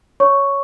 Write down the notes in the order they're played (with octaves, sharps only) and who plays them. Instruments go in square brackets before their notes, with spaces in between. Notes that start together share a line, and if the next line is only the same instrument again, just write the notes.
[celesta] C#5 C#6